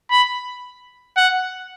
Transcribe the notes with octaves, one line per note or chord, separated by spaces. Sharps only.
B5
F#5